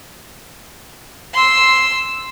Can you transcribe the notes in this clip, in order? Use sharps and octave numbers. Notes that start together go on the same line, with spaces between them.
C6 E6